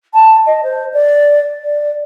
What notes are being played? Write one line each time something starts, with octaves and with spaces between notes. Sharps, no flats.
A5
D#5
C5
D5
D5